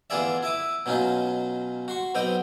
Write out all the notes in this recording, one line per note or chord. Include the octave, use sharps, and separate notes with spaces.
A1 B3 F4 G#4 D5 E5
E4 E5 D6 D#6
B2 F#3 C#4 D#4 F4
F#4 C6 C#6
B1 B3 C4 D#5 G5